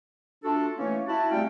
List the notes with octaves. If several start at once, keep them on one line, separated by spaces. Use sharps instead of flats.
A3 D4 F4 F#4 A4
E3 A3 A#3 C#4
E4 F#4 A5
G3 A3 C4 C#4 F5 G5